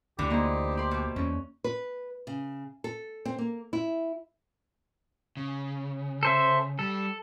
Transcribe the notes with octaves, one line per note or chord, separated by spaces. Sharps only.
D2 D3 E3 G4
A#3 D#4 C5
D5 C6
B2
E2 C#4
B4
C#3
A4
C4
A#3
E4
C#3
A4 C5 E5
G3 A4